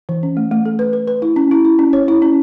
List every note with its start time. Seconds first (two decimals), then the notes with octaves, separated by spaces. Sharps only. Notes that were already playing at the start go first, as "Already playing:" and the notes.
0.09 E3
0.23 C#4
0.37 A3
0.51 A3
0.65 A4
0.79 B4
0.93 B4
1.07 B4
1.22 E4
1.36 C#4
1.51 E4
1.65 E4
1.79 C#4
1.93 C#5
2.08 E4
2.22 C#4